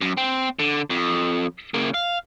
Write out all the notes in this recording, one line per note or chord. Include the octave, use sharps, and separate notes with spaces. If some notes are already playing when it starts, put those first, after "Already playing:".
F#2
C4
D3
F2
C#3 A#3
F5